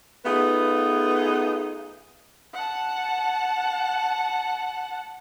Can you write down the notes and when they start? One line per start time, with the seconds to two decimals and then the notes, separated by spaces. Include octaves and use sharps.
0.25 A3 B3 D#4 F4 G#4 B4
2.54 F#5 A5